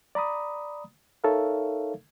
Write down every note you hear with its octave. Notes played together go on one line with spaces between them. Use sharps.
D5 A#5 B5 D#6
D#4 A4 A#4 C#5 E5 F5